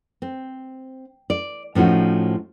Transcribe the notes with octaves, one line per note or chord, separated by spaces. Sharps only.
C4
D5
A2 F3 C#4 D#4 F#4